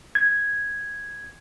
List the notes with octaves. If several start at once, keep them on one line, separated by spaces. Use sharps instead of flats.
G#6